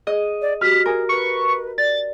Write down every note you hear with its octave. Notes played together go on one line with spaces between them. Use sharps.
G#4 D#5
D5
F#4 G4 F6 B6
G#4 A#4
B4 C#6
D5 A6